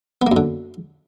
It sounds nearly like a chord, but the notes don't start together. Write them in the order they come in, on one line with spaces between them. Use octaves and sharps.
B3 A#3 F#2 D3